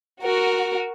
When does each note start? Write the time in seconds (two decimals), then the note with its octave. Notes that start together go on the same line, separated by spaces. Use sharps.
0.23 F#4 A#4